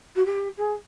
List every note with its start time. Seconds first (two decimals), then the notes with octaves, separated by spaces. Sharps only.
0.15 F#4
0.25 G4
0.57 G#4